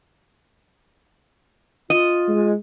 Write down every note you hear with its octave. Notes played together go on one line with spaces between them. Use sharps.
F4 D#5
G#3